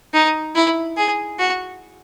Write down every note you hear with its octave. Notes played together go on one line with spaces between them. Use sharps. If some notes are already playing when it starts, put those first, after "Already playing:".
D#4
E4
G#4
F#4